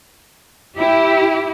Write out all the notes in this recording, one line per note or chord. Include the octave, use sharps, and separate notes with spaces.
E4 G4